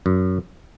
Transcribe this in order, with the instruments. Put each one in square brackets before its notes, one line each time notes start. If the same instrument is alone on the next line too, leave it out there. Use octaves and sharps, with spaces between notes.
[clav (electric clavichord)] F#2